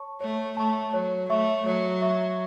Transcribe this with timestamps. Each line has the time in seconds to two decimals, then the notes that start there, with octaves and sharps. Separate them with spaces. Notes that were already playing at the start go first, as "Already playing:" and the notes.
Already playing: C#5 A5 C#6
0.21 A3 C#5
0.57 A3 A5 C#6
0.93 F#3 C#5
1.29 A3 E5 C#6
1.66 F#3 C#5
2.02 E5 C#6